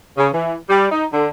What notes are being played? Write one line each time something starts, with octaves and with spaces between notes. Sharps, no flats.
C#3
E3
G3
D#4
D3